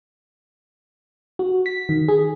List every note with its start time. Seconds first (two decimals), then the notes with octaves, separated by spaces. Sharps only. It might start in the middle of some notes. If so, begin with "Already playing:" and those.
1.39 F#4
1.66 B6
1.89 D#3
2.08 G#4